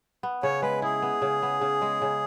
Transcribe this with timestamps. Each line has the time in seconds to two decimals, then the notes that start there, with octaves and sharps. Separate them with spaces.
0.23 B3
0.43 C#3 C#5
0.62 G#3 B4
0.82 E4 G#4
1.02 B3
1.22 C#3
1.42 B3
1.61 C#3
1.82 G#3
2.02 C#3